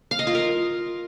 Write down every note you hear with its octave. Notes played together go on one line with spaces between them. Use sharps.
F5
D#5
F4
A#4